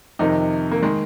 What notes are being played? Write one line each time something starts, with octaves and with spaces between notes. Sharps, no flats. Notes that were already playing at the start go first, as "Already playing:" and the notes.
F2 C3 D#3 D#4
A#3
D#3 G#3